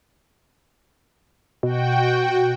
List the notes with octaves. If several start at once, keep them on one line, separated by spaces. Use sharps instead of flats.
B2 F#4 G5